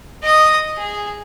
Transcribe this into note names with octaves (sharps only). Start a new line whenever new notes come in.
D#5 D#6
G#4